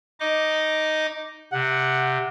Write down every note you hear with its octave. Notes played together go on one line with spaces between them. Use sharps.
D#4 D#5 D6
C3 F#5